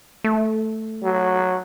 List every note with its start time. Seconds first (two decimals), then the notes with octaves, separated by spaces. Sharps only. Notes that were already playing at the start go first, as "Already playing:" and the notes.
0.24 A3
1.04 F#3